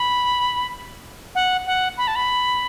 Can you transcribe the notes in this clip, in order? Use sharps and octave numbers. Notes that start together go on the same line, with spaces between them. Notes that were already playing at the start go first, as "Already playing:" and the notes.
Already playing: B5
F#5
F#5
B5
A5
B5